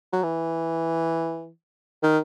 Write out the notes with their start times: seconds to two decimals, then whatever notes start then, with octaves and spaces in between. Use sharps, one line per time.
0.12 F#3
0.23 E3
2.03 D#3